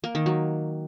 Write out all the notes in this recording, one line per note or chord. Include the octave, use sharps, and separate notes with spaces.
A#3
D#3
F#3